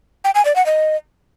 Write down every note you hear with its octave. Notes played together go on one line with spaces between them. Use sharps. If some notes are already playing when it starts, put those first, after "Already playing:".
G5
G#5
D5
F#5
D#5